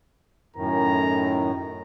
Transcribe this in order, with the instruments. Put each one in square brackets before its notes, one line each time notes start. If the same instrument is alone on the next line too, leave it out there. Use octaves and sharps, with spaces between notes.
[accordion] F#2 A2 D#3 [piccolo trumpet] A#5